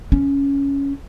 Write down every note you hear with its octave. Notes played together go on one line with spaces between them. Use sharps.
C#4